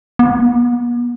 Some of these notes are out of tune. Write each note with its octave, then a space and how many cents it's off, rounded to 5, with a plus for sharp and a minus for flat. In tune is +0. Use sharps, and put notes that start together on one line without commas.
B3 -40